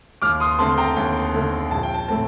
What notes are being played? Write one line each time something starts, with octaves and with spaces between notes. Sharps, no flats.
D#2 D6 F6
C6 D#6
D3 A3 C4 A5 C6
G5 A#5
D#2 G5
D3 A3 C4
A#1 A5
G5
A5
A2 A3 C4 A5